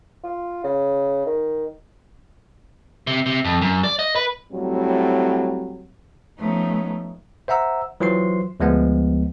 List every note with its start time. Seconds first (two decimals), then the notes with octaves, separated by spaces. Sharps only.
0.24 F4
0.64 C#3
1.26 D#3
3.07 C3
3.26 C3
3.45 F2
3.61 F#2
3.84 D5
3.99 D#5
4.16 B4
4.52 A2 F#3 G3 C4
6.39 F3 A3 B3 C#4 D#4
7.48 C5 E5 F#5 A#5 E6
8.00 E3 F#3 F4 C5 C6 C7
8.60 D2 F3 G#3 B3